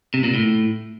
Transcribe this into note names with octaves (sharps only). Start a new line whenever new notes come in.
C3
A#2
A2